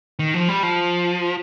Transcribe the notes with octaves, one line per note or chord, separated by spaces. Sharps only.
D#3
F3
G3
F3